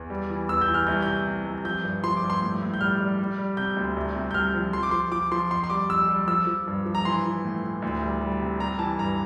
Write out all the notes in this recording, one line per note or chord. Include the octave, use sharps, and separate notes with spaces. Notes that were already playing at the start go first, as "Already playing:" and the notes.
Already playing: E2
G3
E3
E2 E6
G6
E3
F6
C2 G6
C3 G6
C3
C2
F3 G6
G2
F3 C6
D6
G2
C6
A2
A2
G6
G3 F6
G3
G3
G3
C3 G6
D2
C2
C3
G6
C2 F6
F3
F3 C6
D6
F3 C6
F3 D6
F3 C6
F2 C6
C6
G3 D6
F2 E6
G3
F3 E6
F3
G2
F3
A#5
E3 C6
E3
A2
E3
D2
G3
G3
C3
G3 A#5
E3 A5
G2 A#5